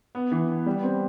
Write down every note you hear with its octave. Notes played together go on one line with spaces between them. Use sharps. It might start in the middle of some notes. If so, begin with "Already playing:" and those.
B3
E3
B3
G3
C4